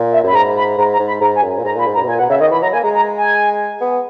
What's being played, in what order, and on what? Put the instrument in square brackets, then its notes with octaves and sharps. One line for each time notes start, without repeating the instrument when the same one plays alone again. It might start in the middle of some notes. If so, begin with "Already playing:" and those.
Already playing: [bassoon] A#2
[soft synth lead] E5
[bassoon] F#2 [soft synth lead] B5
[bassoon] G#2 [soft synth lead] A#5
[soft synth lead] B5
[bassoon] G#2 [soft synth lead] A#5
[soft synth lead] A#5
[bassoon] G#2
[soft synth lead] B5
[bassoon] G#2 [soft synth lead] A#5
[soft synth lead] G#5
[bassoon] F#2
A#2
[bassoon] G#2 [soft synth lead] A#5
[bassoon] A#2 [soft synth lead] B5
[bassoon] G#2
[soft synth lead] A#5
[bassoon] F#2
B2
[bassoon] A#2 [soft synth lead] G#5
[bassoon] B2 [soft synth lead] F#5
[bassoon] C#3 [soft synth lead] E5
[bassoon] D#3 [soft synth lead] D#5
[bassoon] E3 [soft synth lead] B5
[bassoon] F#3 [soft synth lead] A#5
[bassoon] A#3 [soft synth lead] G#5
[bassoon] G#3 [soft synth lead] A#5
[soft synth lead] A#5
G#5
[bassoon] B3